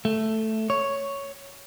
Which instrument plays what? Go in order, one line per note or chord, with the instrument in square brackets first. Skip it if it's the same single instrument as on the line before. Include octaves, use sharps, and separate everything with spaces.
[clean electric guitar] A3
C#5